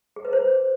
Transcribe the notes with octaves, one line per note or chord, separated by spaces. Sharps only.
G#4
B4
C5